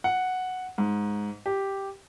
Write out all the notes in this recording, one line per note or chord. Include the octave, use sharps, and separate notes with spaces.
F#5
G#2
G4